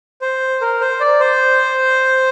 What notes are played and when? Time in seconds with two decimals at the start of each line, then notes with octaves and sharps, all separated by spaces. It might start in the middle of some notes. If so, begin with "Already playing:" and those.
0.22 C5
0.61 A#4
0.81 C5
1.00 D5
1.20 C5